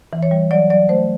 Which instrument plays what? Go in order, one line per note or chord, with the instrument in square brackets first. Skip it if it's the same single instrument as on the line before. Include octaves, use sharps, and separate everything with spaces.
[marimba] E3
C#5
G3
F#3 D5
F#3 D5
A3 C5